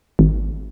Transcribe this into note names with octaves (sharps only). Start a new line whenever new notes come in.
G#1